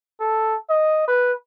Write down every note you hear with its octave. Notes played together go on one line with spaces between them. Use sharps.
A4
D#5
B4